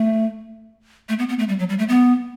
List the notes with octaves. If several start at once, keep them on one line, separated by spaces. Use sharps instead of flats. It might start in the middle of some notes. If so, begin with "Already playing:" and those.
Already playing: A3
A3
B3
B3
A3
G3
F#3
G3
A3
B3